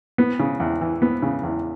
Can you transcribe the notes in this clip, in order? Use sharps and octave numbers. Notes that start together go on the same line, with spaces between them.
B3
C#3
E2
E3
B3
C#3
E2